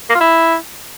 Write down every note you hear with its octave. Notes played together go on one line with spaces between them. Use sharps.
A#3
F4
E4